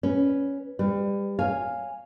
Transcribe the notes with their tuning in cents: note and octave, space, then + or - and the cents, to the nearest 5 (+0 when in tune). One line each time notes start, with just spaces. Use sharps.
C#4 +0 B4 +0
G3 +25 B4 +25
C#5 +0 F5 +0 G#5 -10